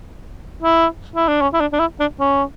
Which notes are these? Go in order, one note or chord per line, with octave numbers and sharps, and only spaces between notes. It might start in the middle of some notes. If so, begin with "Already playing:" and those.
E4
E4
D4
C#4
E4
D4
D4
E4
D4
C#4